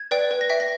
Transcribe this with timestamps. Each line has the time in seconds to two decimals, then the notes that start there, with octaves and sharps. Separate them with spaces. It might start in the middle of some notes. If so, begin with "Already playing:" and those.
Already playing: G#6
0.11 B4 D5 G5
0.31 B4
0.41 A#6
0.49 E5 G5 B6
0.60 A#6